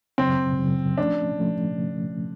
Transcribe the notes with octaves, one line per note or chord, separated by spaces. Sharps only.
F#2 C#3 F#3 C4
F#2 C#3 F#3
F3 A3 C#4 D4
F3 A3 C#4